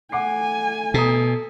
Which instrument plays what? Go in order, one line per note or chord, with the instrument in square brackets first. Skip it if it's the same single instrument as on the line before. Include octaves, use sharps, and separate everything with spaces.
[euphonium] A3 [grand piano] F#5 D6 C7 [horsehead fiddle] G#5
[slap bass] B2 [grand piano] A4 A#5 D#6